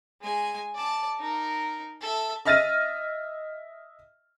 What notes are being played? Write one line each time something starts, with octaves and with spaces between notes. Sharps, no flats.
G#3 G#5
D5 A5
D#4 A#4
A4 E5
D#5 E5 F6 A6 A#6 D#7